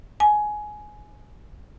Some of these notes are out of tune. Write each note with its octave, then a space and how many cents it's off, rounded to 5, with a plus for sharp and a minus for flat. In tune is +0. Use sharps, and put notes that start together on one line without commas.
G#5 +15